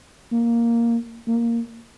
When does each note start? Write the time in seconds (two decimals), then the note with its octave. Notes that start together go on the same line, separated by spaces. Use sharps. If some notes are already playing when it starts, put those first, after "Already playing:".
0.32 A#3
1.28 A#3